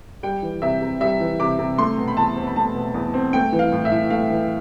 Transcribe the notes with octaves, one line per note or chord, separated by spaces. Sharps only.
G3 G5
E3
C3 E5
C3
G3 E5
E3
C3 D6
C3
A3 C6
B2
B5
E2 A5
C4
B5
A3 A5
B2
E2
C4
A3 G5
E3
F5
A2
E5
A2
A3 F5
E3